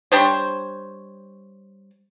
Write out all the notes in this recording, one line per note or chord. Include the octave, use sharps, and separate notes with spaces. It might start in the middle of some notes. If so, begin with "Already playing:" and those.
G3 D4 C5 C#5